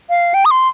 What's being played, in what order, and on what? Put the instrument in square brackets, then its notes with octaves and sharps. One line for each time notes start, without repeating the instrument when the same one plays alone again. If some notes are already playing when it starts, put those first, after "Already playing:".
[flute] F5
G5
D#6
C6